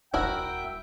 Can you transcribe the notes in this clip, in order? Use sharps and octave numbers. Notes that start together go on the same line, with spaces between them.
D#1 D4 E4 F#4 A#4 E5 G5